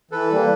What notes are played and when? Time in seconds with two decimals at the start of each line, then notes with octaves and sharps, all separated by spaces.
0.11 E3 A4 B4
0.30 G3 A#3